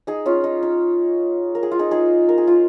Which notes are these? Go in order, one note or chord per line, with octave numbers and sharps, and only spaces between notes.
D#4 G#4
C#4 F4
D#4
D#4
A#4
G#4
F4
D#4 G#4
D#4 G#4
A#4
G#4
F4